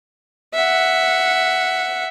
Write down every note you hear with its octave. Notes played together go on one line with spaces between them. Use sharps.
E5 F#5